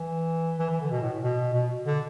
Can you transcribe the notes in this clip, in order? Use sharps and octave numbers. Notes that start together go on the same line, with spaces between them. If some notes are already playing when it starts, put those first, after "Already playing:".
Already playing: E3
E3
E3
D3
B2
A2
B2
B2
D3